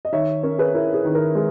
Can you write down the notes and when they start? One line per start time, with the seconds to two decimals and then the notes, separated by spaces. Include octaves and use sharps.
0.05 D#5
0.12 D#3 C#5 E5
0.43 C#4 A#4 C#5
0.58 G#4 B4
0.74 E4 A#4
0.94 G#4
1.05 D#3
1.15 A#4
1.35 G#3